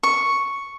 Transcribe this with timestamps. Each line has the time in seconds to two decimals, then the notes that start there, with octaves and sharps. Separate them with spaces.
0.03 C#6